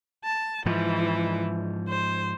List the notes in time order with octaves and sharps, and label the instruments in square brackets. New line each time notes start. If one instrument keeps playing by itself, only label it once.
[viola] A5
[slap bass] G#2 F3 [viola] E3
[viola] C5